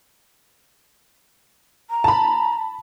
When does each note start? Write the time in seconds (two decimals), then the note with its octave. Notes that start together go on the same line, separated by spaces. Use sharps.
1.90 A#5
2.04 A5 B5